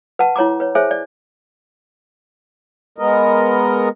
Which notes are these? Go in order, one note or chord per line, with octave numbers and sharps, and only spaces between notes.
B4 F#5 A5
E4 C#5 A#5 D6
B4 C#5
G#4 C5 C#5 E5 G#5
D5
G#3 B3 A#4 D#5